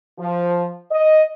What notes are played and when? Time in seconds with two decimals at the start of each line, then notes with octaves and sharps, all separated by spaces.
0.19 F3
0.91 D#5